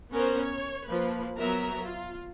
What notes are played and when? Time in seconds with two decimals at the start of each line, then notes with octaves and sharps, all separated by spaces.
0.11 B3 C#4 A#4 C5
0.42 C#5
0.86 F3 A#3 B4
1.38 F#3 B3 A#4 E5 A#5
1.83 F4